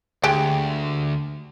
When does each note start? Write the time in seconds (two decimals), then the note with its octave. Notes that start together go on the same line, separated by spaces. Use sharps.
0.23 D2 G#3 G4 G5